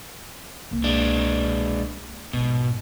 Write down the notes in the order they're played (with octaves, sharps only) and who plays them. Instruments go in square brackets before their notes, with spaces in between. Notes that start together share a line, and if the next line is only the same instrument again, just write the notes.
[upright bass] C2 A#3
[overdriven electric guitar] G#3 D4
[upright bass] A#1 G#2 [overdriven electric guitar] B2